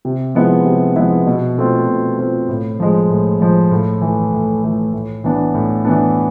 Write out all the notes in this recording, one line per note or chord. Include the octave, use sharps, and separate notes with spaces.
C3
F3 G#3 B3 E4
C3
F3 G#3 B3 E4
B2
A3 C4 F4
B2
A3 C4 F4
A2
F3 G#3
A2
F3 G#3
A2
E3 A3
A2
E3 A3
A2
E3 B3 D4
A2
E3 B3 D4